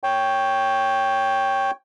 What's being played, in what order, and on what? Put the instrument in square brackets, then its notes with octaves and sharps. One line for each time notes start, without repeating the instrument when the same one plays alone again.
[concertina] C#5 G5